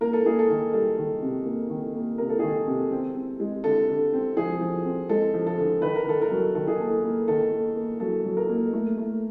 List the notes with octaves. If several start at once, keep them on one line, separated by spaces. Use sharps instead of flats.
A#3 A#4
A4
A#3 G#4
A4
D#3
G3 A4
D#3
C3
A#3
D#3
A#3
C3 A#4
A4
D#3 G#4
A4
C3
C4
C4
G#3
D3 A4
D3
C4
F3 G#4
F3
C4
G#3 A4
F3
A4
D3
D#3 B4
A#4
D#3 A4
A#4
F#3
D#3 A4
G#4
A#3 A4
A#3
D#3 A4
A#3
A#3
F#3 A4
F#3
A#4
A#3
A3
A3